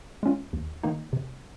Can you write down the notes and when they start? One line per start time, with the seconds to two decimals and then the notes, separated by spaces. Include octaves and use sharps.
0.23 G#3 C#4 F4
0.53 D#2
0.83 D#3 A#3 D#4
1.13 C3